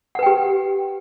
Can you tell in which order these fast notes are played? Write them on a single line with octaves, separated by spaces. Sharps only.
F#5 B4 G5 G4